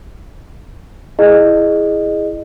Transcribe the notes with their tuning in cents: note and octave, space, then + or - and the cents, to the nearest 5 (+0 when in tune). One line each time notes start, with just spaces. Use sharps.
E4 +0 G#4 +0 D#5 -20